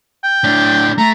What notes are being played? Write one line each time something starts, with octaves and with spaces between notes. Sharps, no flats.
G5
A2 D4
A3 A#5